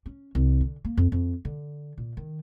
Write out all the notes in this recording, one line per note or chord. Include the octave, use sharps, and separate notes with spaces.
C#4
C2
D3
A#3
F2
F2
D3
A#2
D#3